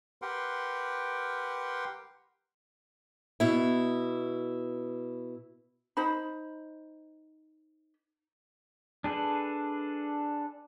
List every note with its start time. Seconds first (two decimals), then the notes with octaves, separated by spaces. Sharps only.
0.22 G4 A#4 B4 F#5 G5 C6
3.40 B2 E4
5.97 D#4 C5 B5
9.04 D4 G#4 A4 B4